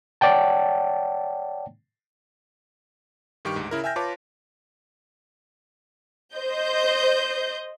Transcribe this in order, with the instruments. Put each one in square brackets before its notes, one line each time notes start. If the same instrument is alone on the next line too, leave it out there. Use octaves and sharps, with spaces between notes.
[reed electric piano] C#5 D5 F#5 G5 A5
[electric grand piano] G2 D#3 G4 G5 C#6 D7
D2 G#2
C#3 E4 A#4
E5 G5 G#5 F6 G6 A#6
F4 B4 C#5 A5 D6
[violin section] C5 D#5 G6